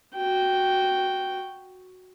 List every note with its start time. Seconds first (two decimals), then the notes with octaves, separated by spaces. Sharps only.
0.16 F#4 G5